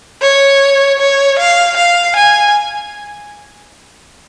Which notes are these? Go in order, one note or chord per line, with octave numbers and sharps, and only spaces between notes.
C#5
C#5
F5
F5
G#5